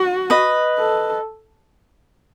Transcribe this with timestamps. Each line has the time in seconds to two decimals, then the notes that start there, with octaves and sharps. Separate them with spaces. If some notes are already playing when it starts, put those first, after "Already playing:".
Already playing: F#4
0.30 B4 D#5
0.79 A4